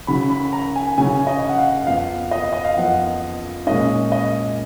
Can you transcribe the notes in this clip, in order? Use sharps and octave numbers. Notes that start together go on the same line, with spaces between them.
C#3 F#3 C#4 B5
B5
A#5
G#5
C#3 F#3 C#4 G#5
D#5
F#5
F5
F2 F3 B3 F5
D#5
D#5
F5
F2 F3 B3 F#5
A#2 G#3 C#4 D#5
D#5